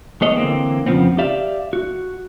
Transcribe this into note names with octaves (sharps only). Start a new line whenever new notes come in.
B3 G#4 C#5 D#5
D3 E3 A#3 C4
F2 C#3 F3 B3 C4
G4 D5 E5 F5
F#4